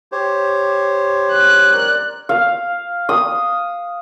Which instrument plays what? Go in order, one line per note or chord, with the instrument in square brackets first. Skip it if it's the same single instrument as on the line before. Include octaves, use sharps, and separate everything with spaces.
[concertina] G4 C5 C#5
[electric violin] F#6
[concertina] A#4 D5
[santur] F5
D#6